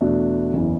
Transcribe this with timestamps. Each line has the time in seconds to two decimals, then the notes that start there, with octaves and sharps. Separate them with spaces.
0.01 E2 B2 A3 D4 F#4
0.53 F#1 E2 C#3 E3